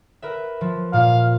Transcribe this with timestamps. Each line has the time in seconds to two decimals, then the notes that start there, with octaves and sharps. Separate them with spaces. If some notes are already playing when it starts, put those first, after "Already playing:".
0.22 A#4 B4 E5
0.61 F3
0.93 A#2 F5